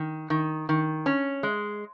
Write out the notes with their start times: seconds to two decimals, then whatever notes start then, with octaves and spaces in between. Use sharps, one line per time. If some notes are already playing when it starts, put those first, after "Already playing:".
Already playing: D#3
0.30 D#3
0.69 D#3
1.06 C#4
1.43 G#3